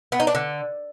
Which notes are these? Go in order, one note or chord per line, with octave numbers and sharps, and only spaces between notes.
B3
D#4
D4
D3